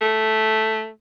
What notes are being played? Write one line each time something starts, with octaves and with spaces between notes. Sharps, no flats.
A3